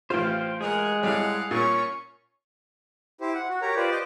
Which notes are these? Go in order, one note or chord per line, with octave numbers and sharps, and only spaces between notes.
A1 F4 C5 F5 G5
G#3 G#4 A#4 F#5
A2 G3 F5 F#5
A#2 C#4 C#6
E4 G4 C5
F#5
F#4
G4 A#4 C#5 A#5
F4 G4 B4 C5 D5
G4 C5 D#5 G5 D6